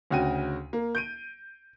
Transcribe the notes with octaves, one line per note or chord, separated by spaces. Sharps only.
D2 C#3 F#4 G5 D#7
A#3
G6 D7 D#7